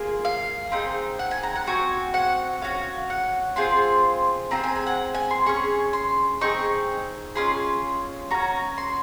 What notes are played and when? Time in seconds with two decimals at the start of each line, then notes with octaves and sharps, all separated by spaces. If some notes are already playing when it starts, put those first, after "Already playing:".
Already playing: A#3 F4 G#4
0.25 F5
0.72 C4 D#4 G#4
1.19 F#5
1.31 G#5
1.43 A#5
1.56 F#5
1.67 C4 F#4 G#5
2.14 F#5
2.61 C#4 F#4 F5
3.10 F#5
3.56 C4 F4 G#4 C6
4.51 C4 F4 A#5
4.56 G#4
4.64 G#5
4.76 G#5
4.86 F#5
5.14 G#5
5.31 C6
5.46 C#4 G#4 C#6
5.93 C6
6.41 C4 D#4 G#4 C#6
7.35 C#4 F4 G#4 C6
8.31 C#4 F#4 A#5
8.78 C6